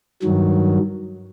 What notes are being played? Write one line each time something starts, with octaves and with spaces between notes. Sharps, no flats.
G2 D#3 F#3